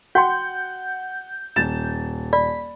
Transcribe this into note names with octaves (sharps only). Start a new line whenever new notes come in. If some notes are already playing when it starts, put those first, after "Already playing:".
F#4 F#5 G5 C6 G6
D#1 A6 E7
D5 B5